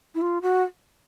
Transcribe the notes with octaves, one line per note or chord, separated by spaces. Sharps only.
E4
F4
F#4